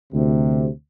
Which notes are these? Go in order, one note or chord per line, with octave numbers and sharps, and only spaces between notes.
D2 C3